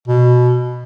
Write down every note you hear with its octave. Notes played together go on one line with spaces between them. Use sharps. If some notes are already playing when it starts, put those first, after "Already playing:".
B2